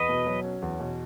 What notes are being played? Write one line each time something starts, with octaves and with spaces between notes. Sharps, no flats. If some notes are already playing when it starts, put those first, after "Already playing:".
Already playing: E2 B4 D#5
B2
F#3
C#4
E2
B2